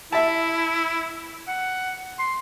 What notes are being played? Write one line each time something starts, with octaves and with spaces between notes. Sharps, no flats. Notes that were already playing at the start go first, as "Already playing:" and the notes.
E4 E5 A5
F#5
C6